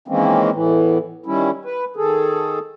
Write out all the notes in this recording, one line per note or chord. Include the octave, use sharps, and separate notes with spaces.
D#3 E3 G#3 A#3 C4 C#4
E2 A2 E3
D#3 G3 C#4 E4
B4
D#3 G#4 A4